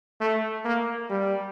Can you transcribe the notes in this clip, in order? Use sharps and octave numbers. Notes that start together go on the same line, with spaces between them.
A3
A#3
G3